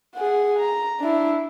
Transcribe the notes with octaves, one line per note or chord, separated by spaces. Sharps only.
G#4 F#5
A#5
D4 E4